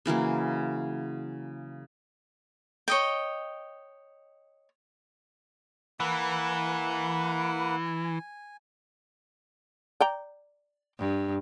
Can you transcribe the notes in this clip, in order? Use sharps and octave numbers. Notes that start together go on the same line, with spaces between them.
C#3 E3 F#3 A#3
C#5 D#5 G5
E3 A#3 B4 F#5
G#5
D5 G5 A#5
G2